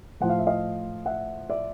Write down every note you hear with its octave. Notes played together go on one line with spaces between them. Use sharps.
A2 F3 F#5
F5
E5
D#5 F5
E5 F#5
D5 E5